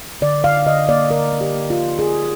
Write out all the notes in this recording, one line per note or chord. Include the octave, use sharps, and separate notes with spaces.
D3 D5
D3 F5
D3 D#5
A#3 D5
D3 A#4
A#3
G4
A#3
F4
D3
A#3 G#4